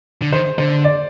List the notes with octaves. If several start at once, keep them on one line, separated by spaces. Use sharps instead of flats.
D3
D#3 C5
D3 C5
D5